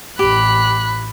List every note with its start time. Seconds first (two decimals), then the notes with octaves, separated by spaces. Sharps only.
0.19 A1 G4 B5 F#6